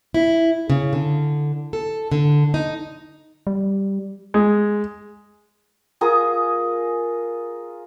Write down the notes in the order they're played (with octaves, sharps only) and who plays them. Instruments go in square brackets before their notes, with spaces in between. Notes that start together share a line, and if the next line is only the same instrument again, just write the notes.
[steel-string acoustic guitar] E4
C#3
D3
A4
D3
D#4
[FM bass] G3
[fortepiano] G#3
[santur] F4 G#4 A#4 D#6